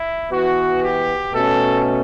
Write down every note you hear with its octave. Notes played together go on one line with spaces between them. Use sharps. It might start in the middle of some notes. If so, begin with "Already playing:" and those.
Already playing: E4
E3 B3 F#4
G4
B2 A3 C#4 A4